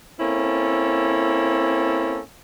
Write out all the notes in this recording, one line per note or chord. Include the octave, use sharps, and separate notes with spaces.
A#3 C4 C#4 E4 A4